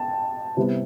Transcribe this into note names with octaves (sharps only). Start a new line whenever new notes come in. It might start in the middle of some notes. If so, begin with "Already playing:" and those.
Already playing: G5 A5
C3 G3 B3 E4